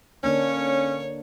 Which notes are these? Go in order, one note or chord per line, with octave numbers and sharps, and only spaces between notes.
D3 A#3 C#4 D4 C#5